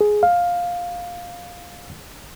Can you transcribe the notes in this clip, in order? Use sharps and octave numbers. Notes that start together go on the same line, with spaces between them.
G#4
F5